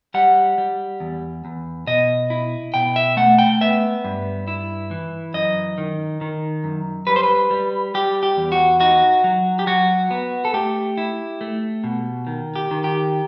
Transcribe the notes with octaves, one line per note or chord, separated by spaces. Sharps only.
G3 F#5
G3
E2
E2
B2 D#5
E4
B2 G5
E5
A3 F#5
G5
B3 E5
G2
E4
E3
F#2 D#5
D#3
D#3
F#2
G3 B4
C5
B4
G3
G3 G4
G4
E2
F#4
D#4 F#4
F#3
G4
F#3 F#4
B3
A4
A3 G4
E4
A3
B2
D#3
G4
D#3
G4